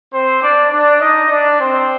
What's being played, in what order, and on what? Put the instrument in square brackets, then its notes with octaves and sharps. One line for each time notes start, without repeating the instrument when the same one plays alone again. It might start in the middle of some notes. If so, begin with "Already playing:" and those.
[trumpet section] C4 C5
D4 D5
D4 D5
D#4 D#5
D4 D5
C4 C5